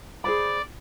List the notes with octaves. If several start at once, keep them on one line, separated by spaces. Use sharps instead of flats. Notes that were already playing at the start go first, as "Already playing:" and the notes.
G#4 C5 D5 B5